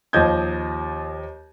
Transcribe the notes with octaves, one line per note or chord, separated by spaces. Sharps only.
D#2 F3 D#5 G6 G#6